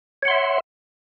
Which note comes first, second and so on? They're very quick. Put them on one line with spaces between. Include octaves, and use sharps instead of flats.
C#5 F#5 C6 E5